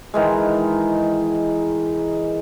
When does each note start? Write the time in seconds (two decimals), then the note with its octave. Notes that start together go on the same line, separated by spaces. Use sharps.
0.14 D#3 E3 G#3